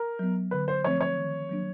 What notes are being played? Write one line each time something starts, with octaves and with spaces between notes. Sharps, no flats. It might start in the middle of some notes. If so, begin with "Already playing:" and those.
Already playing: A#4
F#3 B3
D3 B4
C5
F3 A3 C4 C#5
C#5
D#3
F#3 A#3 D4